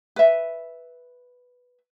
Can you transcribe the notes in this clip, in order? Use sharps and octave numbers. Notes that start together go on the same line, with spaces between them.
B4 E5